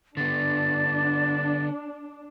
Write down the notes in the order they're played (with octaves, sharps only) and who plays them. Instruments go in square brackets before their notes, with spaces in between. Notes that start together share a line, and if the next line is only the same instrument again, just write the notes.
[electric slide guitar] D3 B3 [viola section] D4 [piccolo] A6